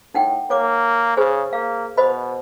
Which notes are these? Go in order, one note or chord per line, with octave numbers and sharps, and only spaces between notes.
A2 D#4 F#5 G5
A#3 C#5 D6
C#3 G#4 C5
A#3 F5
B2 C5 D#5 B5